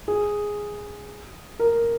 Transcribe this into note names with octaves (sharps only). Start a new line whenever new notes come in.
G#4
A#4